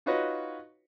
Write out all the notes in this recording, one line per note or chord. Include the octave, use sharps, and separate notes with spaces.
D#4 F4 F#4 B4 C#5 D#5